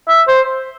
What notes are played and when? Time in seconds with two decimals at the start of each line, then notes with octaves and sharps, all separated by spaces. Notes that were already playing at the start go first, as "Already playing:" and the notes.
0.08 E5
0.28 C5